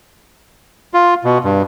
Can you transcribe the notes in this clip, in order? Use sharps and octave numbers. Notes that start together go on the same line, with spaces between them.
F4
B2
G2